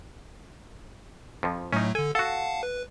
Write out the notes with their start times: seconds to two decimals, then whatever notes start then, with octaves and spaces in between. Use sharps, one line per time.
1.43 F2 F3
1.73 A2 F#3 A3 C#4 D#4
1.95 D3 A4 G#5
2.15 F#4 A4 F5 F#5 A5
2.63 B4